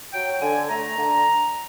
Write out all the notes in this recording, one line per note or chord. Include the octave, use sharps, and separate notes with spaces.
F#3 G5
D3 G#5
A3 A#5
D3